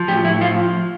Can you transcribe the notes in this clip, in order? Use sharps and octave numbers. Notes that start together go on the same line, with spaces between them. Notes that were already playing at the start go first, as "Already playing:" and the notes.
Already playing: F3
A2 G4
A2 E4
F3 F4